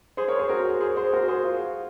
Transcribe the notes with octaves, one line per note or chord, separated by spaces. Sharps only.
G#4 C5
A#4 C#5
G#4 C5
F#4 A#4
G#4 C5
G#4 C5
F#4 A#4
G#4 C5
F4